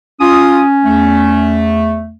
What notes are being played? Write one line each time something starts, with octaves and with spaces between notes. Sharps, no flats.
C#4 F4 D#6
E2 A3